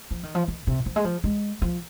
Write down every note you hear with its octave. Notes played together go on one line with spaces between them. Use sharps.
F3
D#3
F3
D#3
C3
F3
G#3
F3
G#3
F3